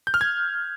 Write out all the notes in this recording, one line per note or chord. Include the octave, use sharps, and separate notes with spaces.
G6
F6
G#6